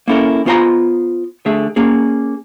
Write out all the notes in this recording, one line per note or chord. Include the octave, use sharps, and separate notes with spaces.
A#3 C#4 E4 A4 A#4
B3 F4 C5 F#5 A#5 B5
D3 A3 G#4 E5
A#3 C#4 G#4